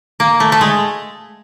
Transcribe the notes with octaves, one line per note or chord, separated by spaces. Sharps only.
A#3
A3
A3
G#3